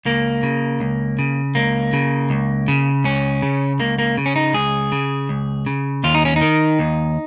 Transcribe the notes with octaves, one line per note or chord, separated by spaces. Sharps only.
C#2 A#3
C#3
C#2
C#3
C#2 A#3
C#3
C#2
C#3
C#2 C#4
C#3
C#2 A#3
A#3
C#3
C#4
D#4
C#2 G#4
C#3
C#2
C#3
D#2 F4
D#4
C#4
D#4
D#3
D#2